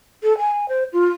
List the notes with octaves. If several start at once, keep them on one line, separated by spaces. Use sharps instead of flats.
A4
G#5
C5
F4